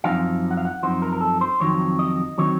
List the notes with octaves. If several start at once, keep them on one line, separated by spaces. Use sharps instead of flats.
F#2 F3 C4 D#4 F5
F#5
F5
F#5
F#2 F3 C4 D#4 C5
A#4
A#4
A4
C5
F2 D#3 F#3 C4 D#4 C#5
D#5
D#3 F#3 C4 D#4 C#5